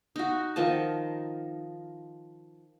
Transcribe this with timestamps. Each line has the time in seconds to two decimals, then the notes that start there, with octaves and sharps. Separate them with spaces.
0.16 D#4 F#4
0.56 D#3 F3 D#5 A5